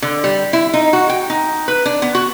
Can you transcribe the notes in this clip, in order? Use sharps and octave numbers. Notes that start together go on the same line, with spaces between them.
D3
G3
E4
D#4
F#4
G5
D#4
B4
D4
B3
F#4